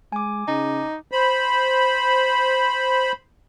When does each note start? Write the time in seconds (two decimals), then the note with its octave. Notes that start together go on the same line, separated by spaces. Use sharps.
0.12 G#3 G#5 D6
0.48 C#3 D#4
1.12 C5 B5